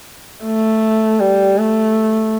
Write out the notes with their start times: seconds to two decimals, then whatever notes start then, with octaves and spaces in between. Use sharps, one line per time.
0.45 A3
1.20 G3
1.58 A3